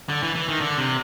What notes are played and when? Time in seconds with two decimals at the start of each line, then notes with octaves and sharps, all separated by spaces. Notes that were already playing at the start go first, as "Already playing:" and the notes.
0.09 D3
0.23 E3
0.35 E3
0.48 D#3
0.61 D3
0.78 C3